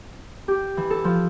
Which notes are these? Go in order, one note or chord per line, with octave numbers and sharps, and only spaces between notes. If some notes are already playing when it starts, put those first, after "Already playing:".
G4
E3
A4
F3